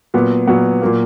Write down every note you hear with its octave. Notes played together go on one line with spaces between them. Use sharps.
A#2 F#3 B3
A#2 F#3 B3
A#2 F#3 A#3